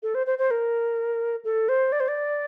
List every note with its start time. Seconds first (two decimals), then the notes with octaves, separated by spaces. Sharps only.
0.03 A4
0.15 C5
0.27 C5
0.39 C5
0.51 A#4
1.45 A4
1.69 C5
1.92 D5
2.00 C5
2.08 D5